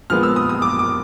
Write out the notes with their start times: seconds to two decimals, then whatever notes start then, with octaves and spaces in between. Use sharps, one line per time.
0.10 A#2 F3 G#3 B3 F6
0.23 E6
0.36 D#6
0.49 D#6
0.62 D6
0.79 D6